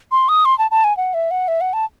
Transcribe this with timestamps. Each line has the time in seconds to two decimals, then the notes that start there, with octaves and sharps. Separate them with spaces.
0.12 C6
0.29 D#6
0.45 C6
0.58 A5
0.71 A5
0.84 G#5
0.97 F#5
1.14 E5
1.31 F#5
1.48 E5
1.61 F#5
1.73 A5